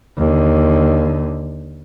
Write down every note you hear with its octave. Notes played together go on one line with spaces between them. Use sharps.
D#2 D3